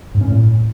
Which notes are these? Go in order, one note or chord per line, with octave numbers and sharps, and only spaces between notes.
G#2
C#4
A2